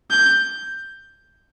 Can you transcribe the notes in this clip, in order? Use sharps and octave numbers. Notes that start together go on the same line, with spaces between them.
G6